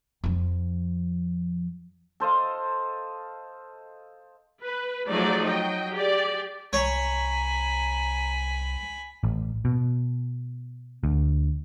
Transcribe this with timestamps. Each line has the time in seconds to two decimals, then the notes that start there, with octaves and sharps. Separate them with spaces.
0.24 F2 F3
2.20 A4 C5 D#5 F5
4.62 B4
5.08 F3 F#3 A3 D#4 G#4 D5
5.44 F#3 D#5 G5
5.92 G4 G#4 D5
6.73 C2 C#5 G#5 A#5 B5
9.24 A1
9.65 B2
11.03 D2